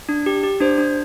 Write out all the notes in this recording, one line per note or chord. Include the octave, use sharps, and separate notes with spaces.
D4
G4
G4
D4 C5
D4